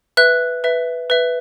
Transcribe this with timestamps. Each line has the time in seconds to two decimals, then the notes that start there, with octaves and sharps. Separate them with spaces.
0.17 B4 E5 F#6
0.64 B4 E5
1.10 B4 E5